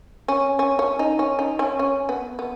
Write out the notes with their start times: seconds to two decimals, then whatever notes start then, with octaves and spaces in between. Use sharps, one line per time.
0.28 C#4
0.59 C#4
0.79 C#4
0.99 D#4
1.19 C#4
1.39 D#4
1.59 C#4
1.79 C#4
2.09 B3
2.39 B3